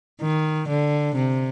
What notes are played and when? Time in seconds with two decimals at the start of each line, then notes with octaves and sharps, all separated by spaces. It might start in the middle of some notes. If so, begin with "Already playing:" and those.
0.21 D#3
0.69 D3
1.16 C3